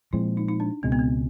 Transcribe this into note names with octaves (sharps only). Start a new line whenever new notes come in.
A#2 F3 G#3 C4 E4
D#4
D#4
D4
C#2 B2 G#3 C4
B3
C4